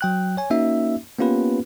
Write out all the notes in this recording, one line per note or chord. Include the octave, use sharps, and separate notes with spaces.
F#3 G5 F#6
C#5 G#5
A#3 C#4 D#4 F#4 E5
A#3 B3 C#4 F4 G4 B4